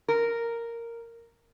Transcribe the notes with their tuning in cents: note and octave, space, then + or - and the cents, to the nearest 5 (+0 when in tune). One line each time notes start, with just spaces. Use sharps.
A#4 -5